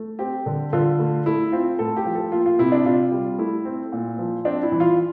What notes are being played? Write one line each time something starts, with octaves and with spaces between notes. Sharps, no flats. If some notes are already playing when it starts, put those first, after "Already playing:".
Already playing: A3
C4 G4
D3
D3 F4
A3
A3 E4
C4 F4
A2 A4
G4
F3
A4
A#3 F4
F4
C3 E4
D4
C3 F4
G3
A3 E4
C4
A#2
F3
C4 D4
E4
E3
F4